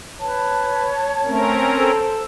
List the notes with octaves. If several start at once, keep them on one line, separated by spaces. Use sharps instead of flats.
B4 C#5 A5
A3 C4 C#4 A#4
A4 C5